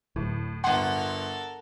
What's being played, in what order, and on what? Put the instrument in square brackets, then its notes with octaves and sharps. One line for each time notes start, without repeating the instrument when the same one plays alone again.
[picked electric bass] D1 [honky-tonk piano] A2
[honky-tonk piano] G1 C6 [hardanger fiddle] A4 A#4 [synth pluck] F#5